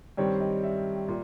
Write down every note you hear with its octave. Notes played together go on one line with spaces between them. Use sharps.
G2 D#3 G3 C4 C#5
D#5
E5
A#2